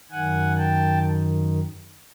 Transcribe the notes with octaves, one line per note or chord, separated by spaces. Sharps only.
F#2 D#3 F#5 G#5
G5 A5